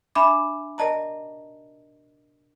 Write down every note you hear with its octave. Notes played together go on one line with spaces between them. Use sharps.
D4 E5 G#5 B5 D6
A#4 D5 D#5 A5 A#5